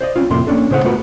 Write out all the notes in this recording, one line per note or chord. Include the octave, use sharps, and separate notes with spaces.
C5 D5 D#5
C4 C#4 F4
F2 A2 C3 A3 A#3 C6
A#3 C#4 D4 A4
A2 C#3 C5 E5 F#5
A3 B3 F4 F#4 A#4 B4